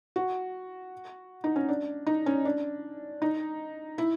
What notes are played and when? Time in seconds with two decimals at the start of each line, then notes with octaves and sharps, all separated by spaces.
0.16 F#4
1.44 D#4
1.56 C#4
1.69 D4
2.07 D#4
2.26 C#4
2.45 D4
3.22 D#4
3.98 E4